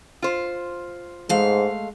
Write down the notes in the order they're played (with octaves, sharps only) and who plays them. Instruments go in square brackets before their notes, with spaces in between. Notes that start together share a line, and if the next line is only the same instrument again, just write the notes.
[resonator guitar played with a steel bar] F4 C5
[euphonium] G#2 [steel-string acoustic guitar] G#3 A3 F5